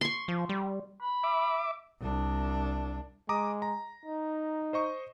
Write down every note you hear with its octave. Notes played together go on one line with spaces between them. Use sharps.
C6 C#6
F3
G3
B5
E5 D6
C2 D4
G#3 A#5 D6 D#6
A#5
D#4
C5 D#5 C#6